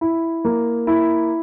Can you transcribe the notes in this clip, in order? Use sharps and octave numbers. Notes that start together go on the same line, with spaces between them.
E4
A#3
E4